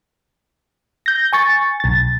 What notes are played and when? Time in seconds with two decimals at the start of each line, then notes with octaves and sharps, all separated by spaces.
1.06 G6 A#6
1.33 G#5 C#6 A6
1.80 B1 A6